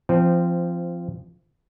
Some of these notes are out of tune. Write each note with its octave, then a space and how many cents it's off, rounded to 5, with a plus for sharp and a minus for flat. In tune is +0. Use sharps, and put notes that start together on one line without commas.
F3 -20 C4 -5